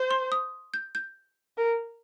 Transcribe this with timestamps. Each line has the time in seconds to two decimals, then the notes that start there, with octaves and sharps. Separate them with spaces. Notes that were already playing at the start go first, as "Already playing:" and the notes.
Already playing: C5
0.11 C6
0.32 D#6
0.74 G6
0.95 G6
1.57 A#4